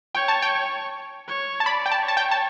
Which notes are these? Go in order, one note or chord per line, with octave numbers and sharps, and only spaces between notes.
C#5 G5
A5
G5
C#5
A5
D5 B5
G5
A5
C#5 A5
G5
A5